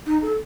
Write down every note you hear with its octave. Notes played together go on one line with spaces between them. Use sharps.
D#4
A4